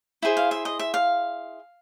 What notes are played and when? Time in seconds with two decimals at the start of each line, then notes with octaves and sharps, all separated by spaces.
0.22 E4 G#4 C5
0.37 F5
0.51 E5
0.65 D#5
0.79 E5
0.94 F5